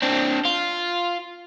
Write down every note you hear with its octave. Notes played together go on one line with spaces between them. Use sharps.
C4 D4
F4